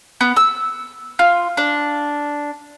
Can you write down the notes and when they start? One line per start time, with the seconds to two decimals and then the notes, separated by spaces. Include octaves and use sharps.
0.21 B3
0.37 E6
1.19 F4
1.57 D4